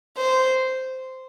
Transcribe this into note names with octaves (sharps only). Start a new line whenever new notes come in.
C5